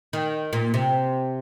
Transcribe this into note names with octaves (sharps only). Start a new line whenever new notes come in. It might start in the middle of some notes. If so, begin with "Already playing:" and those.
D#3
A#2
C3